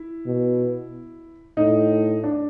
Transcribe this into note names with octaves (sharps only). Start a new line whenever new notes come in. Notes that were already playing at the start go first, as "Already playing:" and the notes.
Already playing: E4
B2
A2 D#4
D4